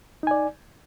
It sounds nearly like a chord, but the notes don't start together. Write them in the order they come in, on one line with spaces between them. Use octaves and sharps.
D#4 G#5 D5